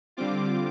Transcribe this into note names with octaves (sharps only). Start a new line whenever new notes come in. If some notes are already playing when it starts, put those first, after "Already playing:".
D3 G3 C4 F4 D6